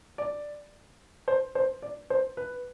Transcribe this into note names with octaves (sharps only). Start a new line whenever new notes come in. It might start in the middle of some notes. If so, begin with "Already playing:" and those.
D5
C5
C5
D5
C5
B4